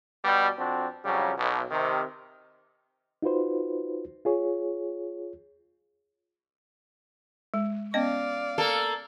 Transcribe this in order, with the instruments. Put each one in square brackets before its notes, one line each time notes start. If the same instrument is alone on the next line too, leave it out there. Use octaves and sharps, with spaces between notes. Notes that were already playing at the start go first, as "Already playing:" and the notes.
[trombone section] B2 G3
F2 C4 D4 F#4
F2 C#3 F#3 G3
B1
C3 D#3
[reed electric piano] D#4 F4 F#4 B4 C5
F4 G#4 C#5
[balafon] G#3
[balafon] B3 C#4 D#5 [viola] D5 F5
[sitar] A#3 A4